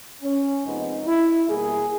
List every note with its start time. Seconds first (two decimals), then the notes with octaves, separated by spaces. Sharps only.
0.22 C#4
0.64 F2 C3 F3 G#3 B3 D#4
1.05 E4
1.47 B2 G3 A#3 G#4